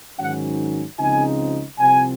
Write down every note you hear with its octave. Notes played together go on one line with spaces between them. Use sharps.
G#2 D#3 F#3 C#4 F#5
C#2 C#3 F3 C4 D#4 G#5
C2 C3 F3 C4 G#5